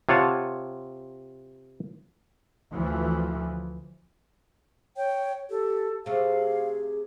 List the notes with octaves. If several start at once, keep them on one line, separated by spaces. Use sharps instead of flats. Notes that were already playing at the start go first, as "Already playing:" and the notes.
C3 F4 C#5 F#5 A5
D2 E3 F3
C#5 G5
G4 A4
C3 A3 G#4 F5